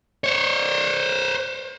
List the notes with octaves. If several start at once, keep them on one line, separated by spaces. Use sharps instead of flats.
C5 C#5